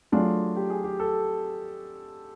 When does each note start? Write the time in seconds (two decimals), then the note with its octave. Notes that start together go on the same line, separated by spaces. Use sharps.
0.12 F#3 A3 D4 F4 G#4
0.56 G4
0.70 G#4
0.84 G4
1.00 A4